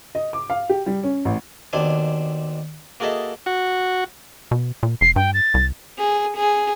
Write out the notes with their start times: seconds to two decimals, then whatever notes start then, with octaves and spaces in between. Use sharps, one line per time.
0.15 D#5
0.33 D6
0.50 F5
0.69 G4
0.86 G3
1.03 C#4
1.25 A1
1.73 D#2 B2 C4 D4 G#5
3.00 A#3 F#4 G#4 A4 D#5 E5
3.46 F#4
4.51 B2
4.83 A#2
5.01 F1 C7
5.16 G2 G5
5.34 A6
5.54 C2
5.98 G#4
6.35 G#4